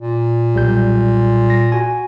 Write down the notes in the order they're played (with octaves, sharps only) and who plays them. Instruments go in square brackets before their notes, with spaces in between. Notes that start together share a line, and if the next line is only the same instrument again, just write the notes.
[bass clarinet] A#2
[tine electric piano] B1 G3 G6
A#6
F#4 G#5